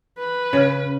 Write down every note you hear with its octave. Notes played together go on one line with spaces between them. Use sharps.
B4
C#3 C#4 C#5 F6